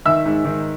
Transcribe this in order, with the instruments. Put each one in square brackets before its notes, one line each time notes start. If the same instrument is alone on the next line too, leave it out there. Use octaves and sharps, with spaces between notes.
[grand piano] D#3 [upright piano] E5 E6
[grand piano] G#2
D#3